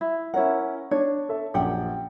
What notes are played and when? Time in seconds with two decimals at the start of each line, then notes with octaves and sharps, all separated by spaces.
0.01 E4
0.34 C#4 E4 A#4 F#5
0.91 D4 C#5
1.29 A4 E5
1.54 A#1 F#2 G4 F#5 G5